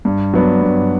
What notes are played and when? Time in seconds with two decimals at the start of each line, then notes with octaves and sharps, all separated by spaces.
0.05 G2
0.34 F#3 B3 D4
0.62 G2